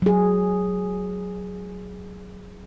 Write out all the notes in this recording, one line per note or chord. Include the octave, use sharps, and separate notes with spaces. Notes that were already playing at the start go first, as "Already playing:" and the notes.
F#3 G#4